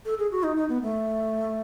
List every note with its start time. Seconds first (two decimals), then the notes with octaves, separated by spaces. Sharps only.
0.05 A4
0.18 G#4
0.32 F#4
0.43 D#4
0.56 D#4
0.69 B3
0.82 A3